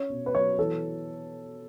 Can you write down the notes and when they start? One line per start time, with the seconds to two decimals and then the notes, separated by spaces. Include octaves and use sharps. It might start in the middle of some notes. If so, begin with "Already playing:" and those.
Already playing: C#4 C#5
0.10 B2
0.26 B4
0.34 F#3 C#5
0.58 E3 A4